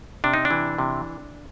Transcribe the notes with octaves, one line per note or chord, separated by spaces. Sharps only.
C3 D4
D#4
D4
E3
C3